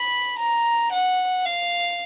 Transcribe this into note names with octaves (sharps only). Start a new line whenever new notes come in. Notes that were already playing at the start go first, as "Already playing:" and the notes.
Already playing: B5
A#5
F#5
F5